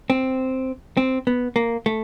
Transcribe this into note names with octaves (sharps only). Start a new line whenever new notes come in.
C4
C4
B3
A#3
A3